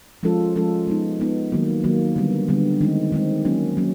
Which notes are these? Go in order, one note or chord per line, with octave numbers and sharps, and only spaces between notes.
F3 G#3 C#4 F4 A4
F3 G#3 C#4 F4 A4
G#3 B3 D#4
G#3 B3 D#4
D#3 F#3 A#3
D#3 F#3 A#3
D3 G3 B3
D3 G3 B3
D#3 G#3 C4 D#4
D#3 G#3 C4 D#4
F#3 A#3 C#4
F#3 A#3 C#4